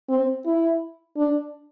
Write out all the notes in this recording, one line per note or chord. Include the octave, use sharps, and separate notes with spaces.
C4
E4
D4